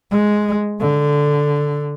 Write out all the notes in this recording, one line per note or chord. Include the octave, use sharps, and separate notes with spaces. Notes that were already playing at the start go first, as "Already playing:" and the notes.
G#3
D3